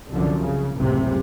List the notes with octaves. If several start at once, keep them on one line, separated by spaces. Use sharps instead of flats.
C2 F#2 D3 F3
C#3
F#1 C#2 A2 C3